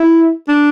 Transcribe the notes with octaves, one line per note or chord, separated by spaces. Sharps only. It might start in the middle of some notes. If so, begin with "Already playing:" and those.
Already playing: E4
D4